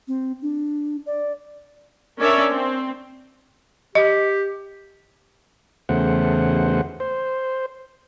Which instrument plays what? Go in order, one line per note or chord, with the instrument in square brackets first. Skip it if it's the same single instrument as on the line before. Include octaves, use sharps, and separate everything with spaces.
[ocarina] C4
D4
D5
[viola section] C#4 D4 A#4 C#5 D5 E5
C4
[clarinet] G4 [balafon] D#5
[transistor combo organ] E2 C#3 A3 C5 F#5
C5